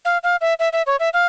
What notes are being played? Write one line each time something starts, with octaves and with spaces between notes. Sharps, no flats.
F5
F5
E5
E5
E5
C#5
E5
F5